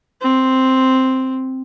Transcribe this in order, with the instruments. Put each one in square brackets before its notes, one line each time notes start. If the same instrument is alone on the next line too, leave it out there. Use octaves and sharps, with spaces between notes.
[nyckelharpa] C4